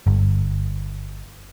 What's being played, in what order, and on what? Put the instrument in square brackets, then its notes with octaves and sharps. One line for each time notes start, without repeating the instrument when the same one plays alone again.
[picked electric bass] G1